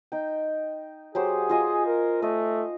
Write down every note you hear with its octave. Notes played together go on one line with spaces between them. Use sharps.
D#4 G5
F#3 G4 G#4 C5
F4 D#5 G#5
A#4
A3 D#5